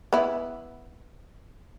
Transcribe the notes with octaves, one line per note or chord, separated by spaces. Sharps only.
B3 E4